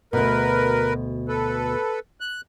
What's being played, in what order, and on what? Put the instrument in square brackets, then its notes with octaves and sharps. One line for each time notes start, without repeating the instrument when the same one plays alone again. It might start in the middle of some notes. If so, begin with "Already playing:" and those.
[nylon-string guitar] D2 B2 [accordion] A#4 B4
[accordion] A4 B4
F#6